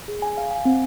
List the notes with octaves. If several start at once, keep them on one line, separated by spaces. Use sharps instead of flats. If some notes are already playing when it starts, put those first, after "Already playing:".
G#4
G#5
F5
G#5
C4